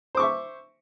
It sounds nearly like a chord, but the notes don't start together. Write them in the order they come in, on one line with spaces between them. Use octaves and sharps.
C5 D6 C#6 E5